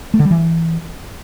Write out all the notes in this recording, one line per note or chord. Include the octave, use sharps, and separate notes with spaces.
A3
D3
G3
E3